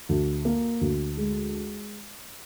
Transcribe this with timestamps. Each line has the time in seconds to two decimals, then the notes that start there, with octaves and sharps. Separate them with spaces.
0.09 D2
0.45 A#3
0.81 D2
1.17 G#3